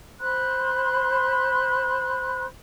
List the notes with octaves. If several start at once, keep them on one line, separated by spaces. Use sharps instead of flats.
C5 B5 C6 F#6